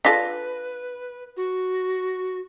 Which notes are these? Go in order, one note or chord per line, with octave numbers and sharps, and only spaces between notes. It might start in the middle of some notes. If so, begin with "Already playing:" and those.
D4 F4 A4 B4 A#6 B6
F#4